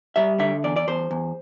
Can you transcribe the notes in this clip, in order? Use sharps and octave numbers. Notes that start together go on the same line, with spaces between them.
G3 E5
D3 E5
E2 D5
D5
E2 C5
E2